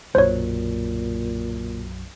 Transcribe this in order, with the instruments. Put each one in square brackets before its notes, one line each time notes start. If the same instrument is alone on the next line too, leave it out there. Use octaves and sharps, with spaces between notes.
[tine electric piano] B1 F#2 F#3 [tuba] A#2 [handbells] C5 C#5